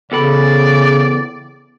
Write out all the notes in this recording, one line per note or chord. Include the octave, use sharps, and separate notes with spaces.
E2 C#3 A4 D5 B5